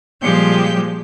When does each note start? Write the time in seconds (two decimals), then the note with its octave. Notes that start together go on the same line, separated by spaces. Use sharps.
0.22 A#2 F3 G3 G#3 G4 G6